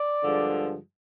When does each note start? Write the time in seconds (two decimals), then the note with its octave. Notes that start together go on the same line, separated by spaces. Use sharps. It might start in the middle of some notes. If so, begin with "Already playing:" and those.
Already playing: D5
0.22 G2 D3 F3 G#3